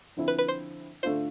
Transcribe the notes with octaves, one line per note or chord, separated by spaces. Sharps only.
D3 F3 C4 E4
B4
B4
C5
D3 A3 D4 F4 C5